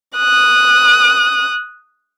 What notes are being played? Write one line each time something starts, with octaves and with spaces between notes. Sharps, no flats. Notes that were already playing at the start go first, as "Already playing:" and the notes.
D#6 F#6